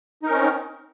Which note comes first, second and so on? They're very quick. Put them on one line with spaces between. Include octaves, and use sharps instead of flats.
D#4 A#4 C#4 C4